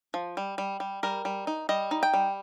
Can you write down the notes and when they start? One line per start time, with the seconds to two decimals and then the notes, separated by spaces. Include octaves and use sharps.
0.14 F3
0.37 G3
0.58 G3
0.80 G3
1.03 G3 A#4
1.25 G3
1.47 D#4
1.69 G3 D#5
1.91 D#4
2.03 G5
2.13 G3